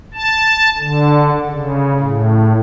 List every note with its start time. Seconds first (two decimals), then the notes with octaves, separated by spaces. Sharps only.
0.14 A5
0.78 D3
1.49 C#3
2.00 A2